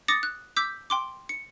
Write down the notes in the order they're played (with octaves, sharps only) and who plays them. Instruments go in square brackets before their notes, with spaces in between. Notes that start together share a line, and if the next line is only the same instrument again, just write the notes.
[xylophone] D6 D#6 A6 A#6 C#7
F#6
D6 E6 G6 B6
G5 C6 D6
C#7